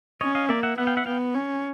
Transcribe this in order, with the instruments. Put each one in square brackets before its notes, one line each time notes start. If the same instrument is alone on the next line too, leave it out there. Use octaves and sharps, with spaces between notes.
[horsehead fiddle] C#4 [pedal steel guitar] C#5 D#5
[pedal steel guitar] D#5 F5
[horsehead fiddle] A#3 [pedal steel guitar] D5 E5
[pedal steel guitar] E5 F#5
[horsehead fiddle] B3 [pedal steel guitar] E5 F#5
[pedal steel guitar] F5 G5
E5 F#5
[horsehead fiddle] B3 [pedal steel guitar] F5 G5
[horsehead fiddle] C#4